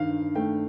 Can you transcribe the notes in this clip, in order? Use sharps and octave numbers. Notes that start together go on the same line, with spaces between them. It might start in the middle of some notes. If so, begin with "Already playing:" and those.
Already playing: G2 D#3 F5
A3 G5